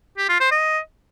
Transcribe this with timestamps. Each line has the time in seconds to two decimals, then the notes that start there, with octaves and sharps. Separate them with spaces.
0.18 G4
0.29 F4
0.40 C5
0.51 D#5